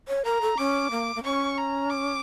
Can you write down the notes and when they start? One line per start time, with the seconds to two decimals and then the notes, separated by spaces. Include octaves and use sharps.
0.08 C#5
0.24 A#4 A#5
0.41 A4
0.57 C#4 D6
0.91 A#3
1.16 A#3
1.24 C#4 C#6
1.57 A#5
1.90 D6